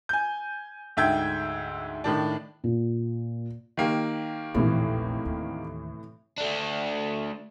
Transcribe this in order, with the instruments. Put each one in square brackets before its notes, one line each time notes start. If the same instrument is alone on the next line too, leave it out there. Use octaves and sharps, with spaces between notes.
[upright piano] G#5 G6
D2 G#2 E5 G5 G6 G#6
A2 D#3 D4
[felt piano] A#2
[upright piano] D#3 A#3 G4
[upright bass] A#1 E2 [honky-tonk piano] A2 C3 E3
[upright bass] D#2
[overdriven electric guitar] A3 D4